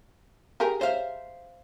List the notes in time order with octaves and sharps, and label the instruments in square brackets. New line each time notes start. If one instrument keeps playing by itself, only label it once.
[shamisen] G4 G#4 A#4
[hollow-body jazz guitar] C5 E5 F5